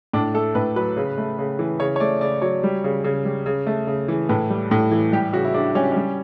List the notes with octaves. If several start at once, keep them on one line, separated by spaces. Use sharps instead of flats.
A2 D4
A3 A4
A2 B4
F#3 B4
C#3
A3
C#3
E3
C#3 C#5
C#5
A3 D5
C#3 D5
F#3 C#5
G3
C#3
C#3
G3
C#3
A3
C#3
E3
A2 B4
G3
A2
E3
G3 G4
C#3 F#4
E4
C#3 D4
G3 C#4
G3 C#4